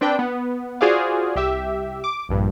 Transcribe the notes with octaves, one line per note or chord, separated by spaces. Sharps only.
C4 D4 B4 G5
B3
F4 F#4 G#4 C5 D5 F5
C2 G4 E5
D6
A#1 G2